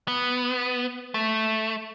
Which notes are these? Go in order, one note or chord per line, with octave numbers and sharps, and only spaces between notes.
B3
A3